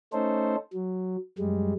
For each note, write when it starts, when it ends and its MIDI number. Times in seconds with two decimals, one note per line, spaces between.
0.13 0.56 57
0.13 0.56 61
0.13 0.56 63
0.13 0.56 69
0.13 0.56 72
0.73 1.17 54
1.38 1.73 42
1.38 1.73 55
1.38 1.73 56